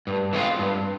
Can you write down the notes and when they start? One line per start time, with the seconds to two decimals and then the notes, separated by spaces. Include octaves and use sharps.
0.07 G2
0.33 E3 G#3 C4 F4
0.59 G2